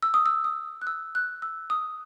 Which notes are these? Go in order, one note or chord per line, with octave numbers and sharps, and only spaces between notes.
E6
D#6
E6
D#6
F#6
E6
F#6
E6
D#6